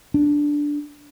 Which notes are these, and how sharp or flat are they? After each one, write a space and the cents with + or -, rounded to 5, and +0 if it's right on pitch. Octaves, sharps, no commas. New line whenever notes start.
D4 -5